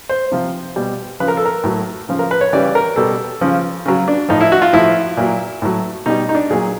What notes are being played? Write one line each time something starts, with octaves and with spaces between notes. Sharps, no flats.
C5
C3 F3
B2 G3
C#3 F3 B4
A#4
A4
A#4
A2 F#3
C#3 F3
A#4
B4
C#5
C#3 E3 G3 D5
A#4
B2 G3 A4
C#3 F3
C#3 F#3
D4
A2 F3 D#4
E4
F#4
F4
A2 F3 E4
A#2 F#3
A2 F#3
B2 G3 D#4
D#4
D4
A#2 F#3 G#4